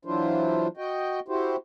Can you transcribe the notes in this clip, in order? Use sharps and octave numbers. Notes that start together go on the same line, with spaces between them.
E3 F#3 D4 E4 F4 C5
F#4 D#5 G5
E4 F#4 G4 C5